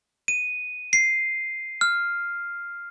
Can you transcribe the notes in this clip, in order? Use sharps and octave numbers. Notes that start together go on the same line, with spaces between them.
D#7
C7
F6